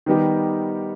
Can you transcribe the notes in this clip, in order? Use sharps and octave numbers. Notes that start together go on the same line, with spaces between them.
D#3 G3 B3 D#4 G4